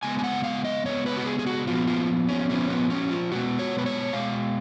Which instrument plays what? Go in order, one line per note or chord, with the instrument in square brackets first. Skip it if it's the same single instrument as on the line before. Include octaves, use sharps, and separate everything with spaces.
[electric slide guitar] C#3 G#3 B3 G#5
G#5
F#5
F5
D#5
C#3 G#3 B3 C#5
B4
F#4
G#4
G#4
F#4
A#2 F3 B3 F4
F4
C#4
A#2 F3 B3 C#4
B3
C#4
F4
B2 G#3 B3 F#4
C#5
B4
C#5
B2 G#3 F5